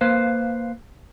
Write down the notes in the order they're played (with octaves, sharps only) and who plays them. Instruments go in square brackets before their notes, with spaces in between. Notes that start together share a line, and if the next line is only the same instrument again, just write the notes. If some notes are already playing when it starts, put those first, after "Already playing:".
[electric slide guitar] A#3 B4 C5 F5